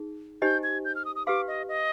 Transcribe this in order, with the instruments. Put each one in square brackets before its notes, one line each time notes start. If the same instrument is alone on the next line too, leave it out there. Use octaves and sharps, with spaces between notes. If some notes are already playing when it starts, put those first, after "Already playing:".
Already playing: [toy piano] D#4 G#4
[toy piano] D#4 G4 C5 D#5 G#5 [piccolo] G6
[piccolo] G#6
G6
F6
D#6
D#6
[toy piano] G4 B4 F5 C6 [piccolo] D6
[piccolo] D#5
D#5